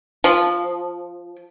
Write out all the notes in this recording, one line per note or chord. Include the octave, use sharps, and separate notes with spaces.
F3